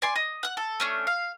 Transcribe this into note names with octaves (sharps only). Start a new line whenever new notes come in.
D5 G#5 C6
D#5
F#5 F#6
A4
A3 C#4 D4
F5